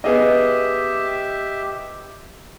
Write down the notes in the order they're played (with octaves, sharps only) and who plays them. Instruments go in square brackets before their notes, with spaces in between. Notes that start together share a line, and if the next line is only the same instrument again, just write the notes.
[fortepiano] B3 G#4 D#5 [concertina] G4 E5